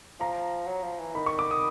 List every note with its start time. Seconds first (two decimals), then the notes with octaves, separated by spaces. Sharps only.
0.20 F3 A#5
0.67 F#3
0.83 F3
1.00 E3
1.15 D#3 B5
1.26 C#6
1.39 D6
1.51 D#6